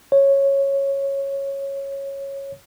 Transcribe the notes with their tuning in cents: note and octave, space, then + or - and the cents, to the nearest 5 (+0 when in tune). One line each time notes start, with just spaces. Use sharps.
C#5 -10